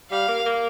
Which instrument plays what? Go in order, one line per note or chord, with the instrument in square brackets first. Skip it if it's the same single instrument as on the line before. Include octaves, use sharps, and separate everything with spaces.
[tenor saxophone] G3 [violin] F5
[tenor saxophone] A#3
A#3